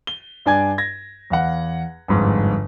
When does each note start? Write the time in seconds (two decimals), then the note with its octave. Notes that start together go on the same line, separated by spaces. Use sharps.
0.07 G7
0.46 G2 D4 D5 G#5 D6 G#6
0.78 G#6 A#6
1.30 E2 F5 F#5
2.08 G1 F2 G#2